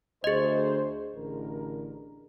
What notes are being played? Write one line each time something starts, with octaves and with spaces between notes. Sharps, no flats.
D2 G#4 C5 D#5
A1 D3 A#4